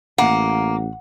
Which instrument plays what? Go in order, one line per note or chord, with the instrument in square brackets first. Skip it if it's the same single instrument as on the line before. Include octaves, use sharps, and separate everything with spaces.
[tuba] A1 [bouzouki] A#3 [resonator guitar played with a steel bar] F#5